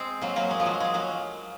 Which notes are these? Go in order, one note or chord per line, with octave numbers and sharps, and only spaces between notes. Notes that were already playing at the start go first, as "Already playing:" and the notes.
Already playing: G#3 C4
F#3 A#3
F#3 A#3
G#3
F3
F#3
G#3
F#3 A#3